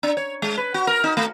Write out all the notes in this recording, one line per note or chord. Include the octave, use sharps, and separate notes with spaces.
D4
C#5
G#3
B4
F#4
A#4
D#4
A3